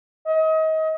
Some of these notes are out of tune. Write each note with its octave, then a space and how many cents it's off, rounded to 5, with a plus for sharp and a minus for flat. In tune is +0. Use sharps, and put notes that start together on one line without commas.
D#5 +30